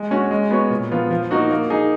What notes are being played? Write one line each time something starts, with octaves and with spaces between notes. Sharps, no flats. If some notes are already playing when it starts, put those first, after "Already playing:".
Already playing: G#3
C#4 F#4
G#3
B3 F#4 C#5
A#2
F3 B3 F4
F3
A#3 D#4 F#4
A#3
D#4 G#4